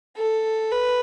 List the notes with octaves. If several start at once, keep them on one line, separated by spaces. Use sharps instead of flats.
A4
B4